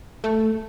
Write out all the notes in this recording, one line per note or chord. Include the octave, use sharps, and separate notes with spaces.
A3